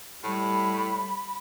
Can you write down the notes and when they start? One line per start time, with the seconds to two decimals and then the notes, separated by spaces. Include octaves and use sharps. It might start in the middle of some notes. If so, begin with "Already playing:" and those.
0.24 A2 G3 B5